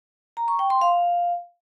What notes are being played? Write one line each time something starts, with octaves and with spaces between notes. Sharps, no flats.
A#5
C#6
G5
C6
F5